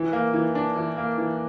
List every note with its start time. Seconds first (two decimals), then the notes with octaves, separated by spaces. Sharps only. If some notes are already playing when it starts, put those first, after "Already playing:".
Already playing: E3
0.13 A#3
0.34 E3
0.55 D4
0.76 E3
0.97 A#3
1.18 E3